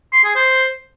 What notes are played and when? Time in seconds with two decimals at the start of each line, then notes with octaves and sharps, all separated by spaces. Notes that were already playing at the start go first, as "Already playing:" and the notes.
0.13 C6
0.24 G#4
0.36 C5